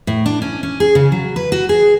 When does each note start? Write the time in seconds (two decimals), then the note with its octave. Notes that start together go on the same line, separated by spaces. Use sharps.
0.07 A2
0.26 D4
0.42 C#4
0.63 C#4
0.80 G#4
0.95 C#3
1.12 F#3
1.36 B4
1.52 F#4
1.69 G#4